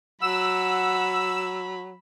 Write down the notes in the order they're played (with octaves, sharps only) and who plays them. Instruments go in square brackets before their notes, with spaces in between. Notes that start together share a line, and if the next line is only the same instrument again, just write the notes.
[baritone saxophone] F#3 [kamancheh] F#5 [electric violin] B5 [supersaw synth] E6